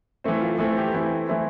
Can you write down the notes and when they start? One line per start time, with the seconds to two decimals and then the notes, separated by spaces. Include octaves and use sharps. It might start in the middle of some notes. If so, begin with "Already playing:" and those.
0.24 E3 A3 C4
0.41 F4
0.58 E3 A3 C4
0.77 G4
0.94 E3 A3 C4 E4
1.29 E3 A3 C4 E4